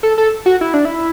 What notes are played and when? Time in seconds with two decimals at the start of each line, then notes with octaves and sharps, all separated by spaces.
0.03 A4
0.18 A4
0.46 F#4
0.61 E4
0.74 D4
0.85 E4